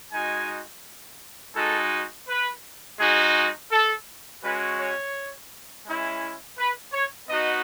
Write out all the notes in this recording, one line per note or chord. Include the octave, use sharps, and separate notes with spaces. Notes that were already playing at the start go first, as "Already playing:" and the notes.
G#3 D#4 F#4 G#5
G#3 D#4 F#4 A4
B4
G#3 D#4 F#4 G#4
A4
G#3 C#4 F#4 B4
C#5
G#3 C#4 E4
B4
C#5
B3 D#4 F#4 D#5